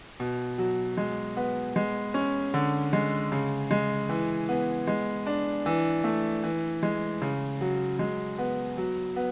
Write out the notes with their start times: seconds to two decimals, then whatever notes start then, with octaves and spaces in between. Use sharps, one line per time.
0.20 B2
0.58 F#3
0.97 G#3
1.37 B3
1.76 G#3
2.14 C#4
2.54 D3
2.93 G#3
3.32 C#3
3.71 G#3
4.09 E3
4.49 B3
4.87 G#3
5.27 D4
5.66 E3
6.04 A3
6.44 E3
6.83 G#3
7.22 C#3
7.61 F#3
7.99 G#3
8.38 B3
8.77 F#3
9.16 B3